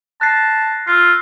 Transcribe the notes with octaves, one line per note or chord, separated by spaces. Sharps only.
A5 F#6 A#6 C7
F4 E6 C7